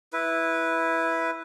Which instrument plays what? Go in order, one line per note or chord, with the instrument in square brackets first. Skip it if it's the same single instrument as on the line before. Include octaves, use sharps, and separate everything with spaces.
[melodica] E4 B4